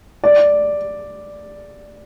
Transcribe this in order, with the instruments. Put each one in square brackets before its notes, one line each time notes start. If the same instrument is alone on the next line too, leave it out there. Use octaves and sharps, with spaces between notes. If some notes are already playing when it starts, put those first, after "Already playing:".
[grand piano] D5